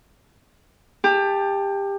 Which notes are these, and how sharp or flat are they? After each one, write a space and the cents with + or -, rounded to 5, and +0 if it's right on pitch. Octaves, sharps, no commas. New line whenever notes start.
G4 +20 A5 +0